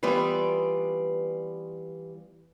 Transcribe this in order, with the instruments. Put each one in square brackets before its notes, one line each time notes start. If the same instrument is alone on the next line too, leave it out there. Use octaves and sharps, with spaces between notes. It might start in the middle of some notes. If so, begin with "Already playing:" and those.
[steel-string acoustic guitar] E3 G3 B3 F4 D5